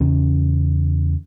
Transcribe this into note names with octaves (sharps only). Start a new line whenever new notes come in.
E2 C#3 C#4